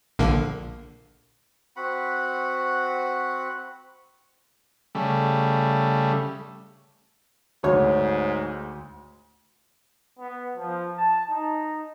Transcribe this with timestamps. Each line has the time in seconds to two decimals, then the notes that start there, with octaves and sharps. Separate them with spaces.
0.19 A#1 D3 A#3
1.76 C4 F#4 F#5 B5
4.95 C#3 G3 A3
7.64 D2 G#2 C#5
10.19 B3
10.57 F3
10.98 A5
11.30 D#4